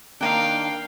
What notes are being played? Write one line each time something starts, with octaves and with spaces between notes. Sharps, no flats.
D#3 A#3 D4 F5 G5